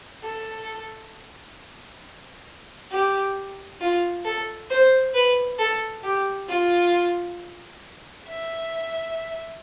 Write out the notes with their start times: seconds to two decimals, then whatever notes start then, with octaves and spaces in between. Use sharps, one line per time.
0.23 A4
2.91 G4
3.80 F4
4.25 A4
4.70 C5
5.14 B4
5.59 A4
6.04 G4
6.48 F4
8.28 E5